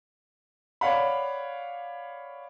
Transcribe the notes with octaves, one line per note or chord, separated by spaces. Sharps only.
C#5 D5 F5 F#5 B5